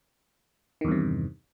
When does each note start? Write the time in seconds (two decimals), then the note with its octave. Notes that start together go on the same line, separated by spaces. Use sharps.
0.81 D#3
0.85 E2
0.88 G2
0.92 C3